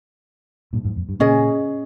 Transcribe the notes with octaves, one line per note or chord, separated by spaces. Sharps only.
G2 A#2
F2 G#2
F2
G2
A#2 C#3 C#4 G#4 D#5